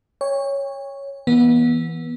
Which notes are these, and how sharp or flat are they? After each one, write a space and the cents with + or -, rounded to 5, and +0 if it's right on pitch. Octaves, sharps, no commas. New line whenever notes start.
C#5 +0 G5 +40
E3 -5 B3 -30